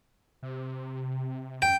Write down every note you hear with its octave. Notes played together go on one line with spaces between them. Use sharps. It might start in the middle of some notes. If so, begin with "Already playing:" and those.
C3
F#2 G5